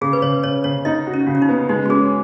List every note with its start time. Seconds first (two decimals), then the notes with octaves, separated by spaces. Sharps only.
0.01 C#3 G#4
0.13 B4
0.22 C#3 C#5
0.44 C#3 C#5
0.64 C#3 C#5
0.85 D#4 D#5
1.07 F#4
1.14 C#4
1.27 C#3
1.35 C#4
1.42 D#4
1.49 B3
1.69 G#3 D#4
1.86 F#4
1.90 C#4 G#4